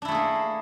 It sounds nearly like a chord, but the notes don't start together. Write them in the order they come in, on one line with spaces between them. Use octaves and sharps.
D4 E4 A3 G#4 A#3